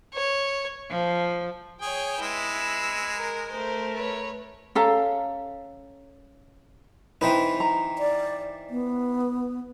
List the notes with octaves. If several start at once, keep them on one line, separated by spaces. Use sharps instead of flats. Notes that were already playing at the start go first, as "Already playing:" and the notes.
C#5
F3
G#4 C#5 G5
G#3 E4 B4 E6
A#4
A3 A#4 C5
B4 C#5
C#4 A4 F5 A#5
E3 C4 D#4 B4
A#5
D5
B3